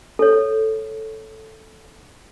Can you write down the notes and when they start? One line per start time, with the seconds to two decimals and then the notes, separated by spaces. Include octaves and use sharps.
0.19 A4 C#5